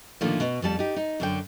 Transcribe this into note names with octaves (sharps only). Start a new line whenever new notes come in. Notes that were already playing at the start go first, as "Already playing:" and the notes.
A2 D3 D#3 F3 A3 A#3
B2
F2 G3 A5
D#4 G4
D#4
F#2 D3 G5